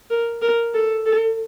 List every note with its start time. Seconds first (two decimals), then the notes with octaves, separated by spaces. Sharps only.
0.10 A#4
0.42 A#4
0.74 A4
1.06 A4